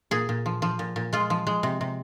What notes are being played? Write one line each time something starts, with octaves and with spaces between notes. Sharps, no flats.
A#2 G#4
A#2
F3
F3
A#2
A#2
G#3 F4
F3
G#3
C3
C3